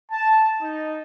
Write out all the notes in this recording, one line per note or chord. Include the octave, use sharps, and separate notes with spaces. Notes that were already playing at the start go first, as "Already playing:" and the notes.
A5
D#4